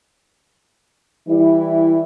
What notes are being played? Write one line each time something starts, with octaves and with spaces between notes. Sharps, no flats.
E3 G3 E4